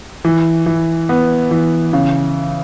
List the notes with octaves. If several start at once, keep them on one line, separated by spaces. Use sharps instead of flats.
E3
E3
B3
E3
C#3